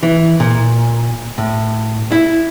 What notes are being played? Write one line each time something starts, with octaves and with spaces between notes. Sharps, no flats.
E3
A#2
A2
E4